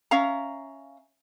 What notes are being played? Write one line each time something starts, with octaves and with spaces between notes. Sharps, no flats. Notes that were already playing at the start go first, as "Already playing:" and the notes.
C#4 E5 F5 A#5